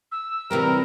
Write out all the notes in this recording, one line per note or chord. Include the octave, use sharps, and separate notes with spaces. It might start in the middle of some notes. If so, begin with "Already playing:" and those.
E6
C3 E3 G3 A#4